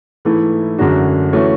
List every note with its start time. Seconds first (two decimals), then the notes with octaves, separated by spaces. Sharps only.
0.25 G#2 E3 A3 E4
0.78 F#2 D3 G#3 D4 F#4
1.33 E3 A3 C#4 F#4